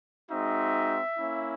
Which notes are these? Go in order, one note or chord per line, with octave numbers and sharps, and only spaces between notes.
G#3 C4 D#4 F#4 E5
A#3 C#4 E4